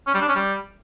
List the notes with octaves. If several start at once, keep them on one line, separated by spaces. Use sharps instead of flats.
C#4
G3
D4
C#4
G3